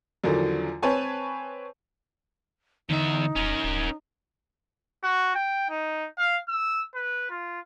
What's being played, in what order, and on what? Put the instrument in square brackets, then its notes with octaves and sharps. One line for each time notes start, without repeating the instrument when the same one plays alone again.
[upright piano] E2 D3 D#3 F3 F#3
C4 B4 C#5 G#5 A5
[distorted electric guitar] E2 E5 [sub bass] D3 [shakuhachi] D#4
[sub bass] D#1 [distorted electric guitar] C#4 A#4
[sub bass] D1
[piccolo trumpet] F#4
G5
D#4
F5
E6
B4
F4